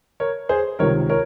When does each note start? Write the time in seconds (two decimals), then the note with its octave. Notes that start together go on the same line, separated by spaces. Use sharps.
0.20 A#4 C#5
0.49 G#4 C5
0.79 C#2 C3 D#3 A#4 C#5
1.10 A#4 C#5